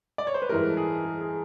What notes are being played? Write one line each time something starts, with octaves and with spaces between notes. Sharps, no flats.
D5
C#5
C5
B4
G#2 E3 G3 A#4
A4
G#4
G#4
G#4